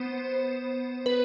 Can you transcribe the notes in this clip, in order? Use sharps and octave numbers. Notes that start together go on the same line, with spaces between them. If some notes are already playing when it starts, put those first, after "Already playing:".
Already playing: B3 C5
B4